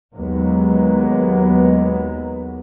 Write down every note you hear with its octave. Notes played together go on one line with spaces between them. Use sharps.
D#2 F#3 G#3 A#3 B3